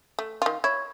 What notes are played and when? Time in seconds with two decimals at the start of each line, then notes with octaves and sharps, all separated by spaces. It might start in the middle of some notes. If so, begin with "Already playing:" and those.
0.19 A3
0.42 D#3 F4
0.64 E4 C#5 C#6 G#6